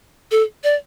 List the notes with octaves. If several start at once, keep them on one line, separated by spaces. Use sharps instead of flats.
A4
D5